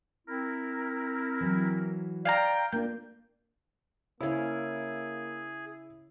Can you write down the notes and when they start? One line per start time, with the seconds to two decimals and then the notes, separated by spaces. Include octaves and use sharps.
0.27 C4 E4 A#4
1.40 E3 F#3
2.25 D5 F5 G5 G#5 A#5
2.72 A#3 D4 F4 G6
4.20 C#3 A#3 C#4 E4 G#4